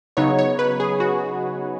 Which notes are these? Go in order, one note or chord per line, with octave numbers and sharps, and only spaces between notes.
C#3 F#3 B3 D#4 C#5
C#5
B4
G#4
F#4